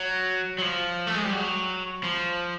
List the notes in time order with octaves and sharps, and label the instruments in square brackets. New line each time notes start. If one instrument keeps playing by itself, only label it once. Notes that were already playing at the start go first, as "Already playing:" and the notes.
Already playing: [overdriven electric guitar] F#3
F#3
F3
A3
G#3
G3
F#3
F3